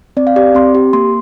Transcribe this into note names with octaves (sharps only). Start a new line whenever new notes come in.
C4 D5
F5
G4 D5
C4 C6
G4
A#3 C6